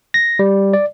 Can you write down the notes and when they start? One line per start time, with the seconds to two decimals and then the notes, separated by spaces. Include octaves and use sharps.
0.14 A#6
0.39 G3
0.73 D5